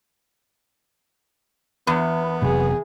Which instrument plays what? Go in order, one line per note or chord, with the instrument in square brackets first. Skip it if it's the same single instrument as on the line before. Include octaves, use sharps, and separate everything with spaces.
[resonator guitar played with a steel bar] E2 [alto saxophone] B3
[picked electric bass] F1 C3 F#3 [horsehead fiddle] G#4